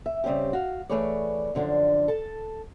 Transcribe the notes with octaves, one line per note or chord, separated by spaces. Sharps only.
E5
C#3 G3 C4 C#4 G4
F#4 F5
E3 A3 G#4 B4 C#5 D5
F#2 D3 F3 D4
A4 A5